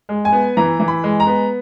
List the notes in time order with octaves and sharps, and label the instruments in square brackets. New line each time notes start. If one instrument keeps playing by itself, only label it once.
[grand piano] G#3
[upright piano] G#5
[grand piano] B3
[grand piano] E3 [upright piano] A#5
[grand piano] E3
[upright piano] B5
[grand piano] G#3
[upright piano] A#5
[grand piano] B3